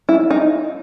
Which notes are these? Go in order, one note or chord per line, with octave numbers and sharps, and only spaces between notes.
E4
D#4